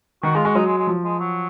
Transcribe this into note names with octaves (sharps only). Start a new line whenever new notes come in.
D#3 F#4
G#3 F4
G#3 F#4
F#3 D#4
G#3
G#3
F3
G#3
F#3